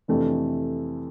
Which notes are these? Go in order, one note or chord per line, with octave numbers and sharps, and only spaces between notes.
F2 C3 E3 A3 D4